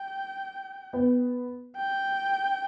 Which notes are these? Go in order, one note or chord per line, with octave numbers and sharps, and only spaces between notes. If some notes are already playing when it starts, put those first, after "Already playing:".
Already playing: G5
B3
G5